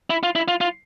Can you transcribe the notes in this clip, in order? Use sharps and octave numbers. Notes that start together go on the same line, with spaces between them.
E4
F4
E4
F4
F4